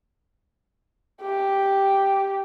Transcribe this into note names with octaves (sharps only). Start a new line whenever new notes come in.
G4